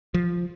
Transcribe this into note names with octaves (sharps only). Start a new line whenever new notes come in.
F3